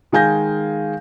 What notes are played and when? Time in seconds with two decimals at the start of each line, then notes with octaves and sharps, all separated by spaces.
0.12 D#3 G#3 F5 G#5 G6 A#6